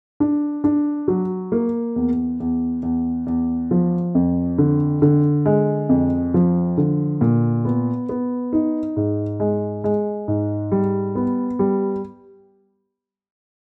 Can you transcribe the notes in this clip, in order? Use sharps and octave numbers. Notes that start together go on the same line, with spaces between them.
D4
D4
F#3
A#3
E2
E2
E2
E2
F3
F2
D3
D3
G#3
F2
F3
D3
A#2
B3
B3
D#4
G#2
G#3
G#3
G#2
G3
B3
G3